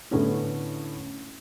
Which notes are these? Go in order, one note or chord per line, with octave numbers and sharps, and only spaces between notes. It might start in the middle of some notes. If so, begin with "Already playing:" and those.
A2 D3 A3 B3 C#4 E4